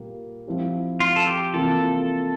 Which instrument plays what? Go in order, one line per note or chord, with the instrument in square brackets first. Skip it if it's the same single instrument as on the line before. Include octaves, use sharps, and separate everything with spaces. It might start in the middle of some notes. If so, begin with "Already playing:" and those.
Already playing: [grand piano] A#2 G3 A#3 F4
F3 C4 E4 G4
[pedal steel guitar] F4
A4
G4
[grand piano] C3 E3 A#3 F4 [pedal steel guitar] A4